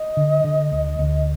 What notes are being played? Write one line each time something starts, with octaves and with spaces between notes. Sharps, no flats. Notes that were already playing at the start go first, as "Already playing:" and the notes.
Already playing: D#5
D3
D3
D2
D2